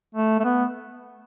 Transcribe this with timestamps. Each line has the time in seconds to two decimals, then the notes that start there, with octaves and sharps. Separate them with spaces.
0.15 A3
0.39 A3
0.44 B3